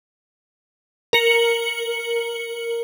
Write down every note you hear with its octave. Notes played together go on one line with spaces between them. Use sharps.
A#4 C#7 F#7